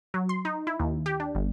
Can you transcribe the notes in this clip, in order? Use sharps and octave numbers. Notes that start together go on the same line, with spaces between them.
F#3
C6
D#4
E4
D#2
G4
D4
G1